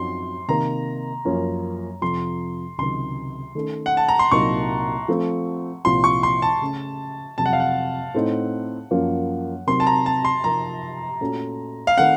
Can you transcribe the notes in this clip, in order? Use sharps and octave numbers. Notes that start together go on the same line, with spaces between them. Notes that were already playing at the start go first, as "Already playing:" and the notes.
Already playing: F#2 F3 C4 D#4 F#4 C6
C3 D#3 A#3 A#5
F#2 F3 A#3 C#4
F2 C3 F3 C6
C#2 C3 D#3 F#3 C6
D#3 A3 C#4 A4
F#5
A5
A#5
C6
C2 A#2 F#3 A#3 D#4 C#6
F3 A3 C4
C2 A#2 F3 C4 C6
C#6
C6
A5
C#3 A3 C#4
F2 C3 F#3 A5
F#5
F5
F#5
A2 A3 C4 D#4
F#2 F3 A#3 C#4
C3 F#3 C4 D#4 A#4 C6
A5
A#5
A5
C6
C3 F3 C4 D#4 A#4 A#5
A#2 A3 C#4 F#4 A4
F5
D#3 A3 C4 F#5